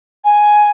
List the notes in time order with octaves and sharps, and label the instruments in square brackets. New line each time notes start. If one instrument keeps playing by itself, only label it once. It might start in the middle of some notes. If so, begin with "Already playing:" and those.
[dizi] G#5